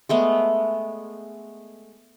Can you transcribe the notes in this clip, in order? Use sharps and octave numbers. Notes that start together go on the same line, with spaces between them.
G#3 A3 B3